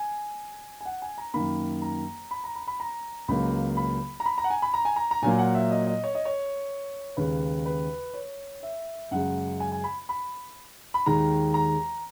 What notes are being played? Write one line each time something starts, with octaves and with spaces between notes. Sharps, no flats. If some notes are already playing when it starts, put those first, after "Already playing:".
Already playing: G#5
G#5
F#5
G#5
A#5
F#2 D#3 A#3 B5
A#5
B5
A#5
B5
B5
A#5
C#2 C#3 F#3 A#3 B5
B5
A#5
B5
A#5
F#5
G#5
B5
A#5
G#5
A#5
A#5
A#2 F#3 A#3 G#5
F#5
E5
D#5
D#5
C#5
D#5
C#5
D#2 C#3 G#3 B4
B4
C#5
E5
F#2 C#3 G#3 F#5
G#5
G#5
B5
B5
B5
D#2 D#3 G#3 A#5
A#5